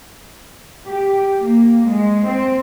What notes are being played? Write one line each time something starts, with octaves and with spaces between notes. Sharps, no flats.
G4
A#3
G#3
C4